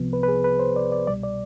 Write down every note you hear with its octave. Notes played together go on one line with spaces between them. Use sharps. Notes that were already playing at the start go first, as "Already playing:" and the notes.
Already playing: C2 C3 F3 B3
B4
B4
G#4
B4
C5
D5
D5
C2 B2 G3 D5
D5